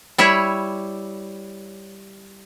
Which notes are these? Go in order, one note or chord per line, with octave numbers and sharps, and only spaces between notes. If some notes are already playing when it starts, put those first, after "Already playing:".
G3 E4 C#5 E5